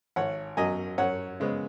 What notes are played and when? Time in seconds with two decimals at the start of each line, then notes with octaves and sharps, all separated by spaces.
0.16 G#1 C#5 F#5
0.57 F#2 F#3 D#5 G#5
0.98 F#2 C#5 F#5
1.40 C#3 G#3 B3